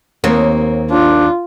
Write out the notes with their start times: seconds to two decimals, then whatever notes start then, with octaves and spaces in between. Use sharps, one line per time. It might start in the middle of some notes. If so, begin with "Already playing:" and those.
0.24 D#2 A#3 C4 C#5
0.91 D4 F4